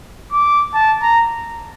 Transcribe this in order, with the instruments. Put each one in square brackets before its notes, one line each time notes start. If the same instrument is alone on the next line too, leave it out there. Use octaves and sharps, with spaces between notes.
[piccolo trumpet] D6
A5
A#5